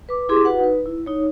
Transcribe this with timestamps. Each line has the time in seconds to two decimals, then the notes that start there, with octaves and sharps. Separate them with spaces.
0.09 B4 D6
0.29 E4 G4 G#4 C6 D6
0.45 F#4 B4 F#5
0.60 D#4 B4
0.86 E4
1.06 D#4 C#5